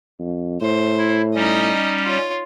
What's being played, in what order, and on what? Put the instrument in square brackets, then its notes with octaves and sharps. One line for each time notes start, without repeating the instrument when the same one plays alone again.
[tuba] F2
[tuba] A2 [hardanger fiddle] C5
[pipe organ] E4
[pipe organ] G3 C#4 [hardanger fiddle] D#4 D#5
[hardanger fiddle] F4 C#5